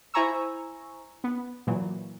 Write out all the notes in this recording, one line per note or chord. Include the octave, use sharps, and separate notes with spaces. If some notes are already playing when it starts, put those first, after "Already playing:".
E4 C5 G#5 A#5 C#6 E6
B3
A#2 E3 F#3